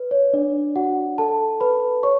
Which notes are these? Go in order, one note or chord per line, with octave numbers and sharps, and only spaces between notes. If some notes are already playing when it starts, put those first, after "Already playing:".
Already playing: B4
C#5
D4 D5
F#4 F#5
A4 A5
B4 B5
C#5 C#6